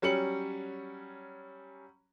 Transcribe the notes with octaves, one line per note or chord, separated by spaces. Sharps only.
F#3 G3 C#4 C#7 F#7